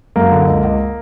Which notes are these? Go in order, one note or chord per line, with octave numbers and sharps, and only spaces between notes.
F#2 A#3
D3
C#2
C#2